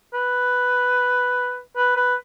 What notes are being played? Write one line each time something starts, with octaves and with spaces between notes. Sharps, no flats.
B4
B4
B4